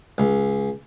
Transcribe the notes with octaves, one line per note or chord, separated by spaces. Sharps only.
C#2